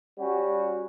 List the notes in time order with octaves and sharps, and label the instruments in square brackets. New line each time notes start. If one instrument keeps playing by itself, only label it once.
[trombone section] G3 C#4 F#4